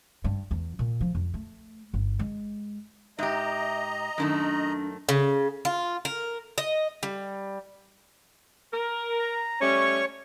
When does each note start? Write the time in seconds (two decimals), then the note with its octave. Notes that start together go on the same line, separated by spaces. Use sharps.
0.24 G2
0.51 E2
0.79 A#2
1.01 F3
1.15 F2
1.34 A3
1.94 G1
2.19 G#3
3.19 G#2 G4 D#5 E5 A#5
4.18 F#2 D#3 A3 D4
5.09 C#3
5.65 F4
6.05 A#4
6.58 D#5
7.03 G3
8.73 A#4
9.19 A#5
9.61 G3 A3 C#4 C#5 C#6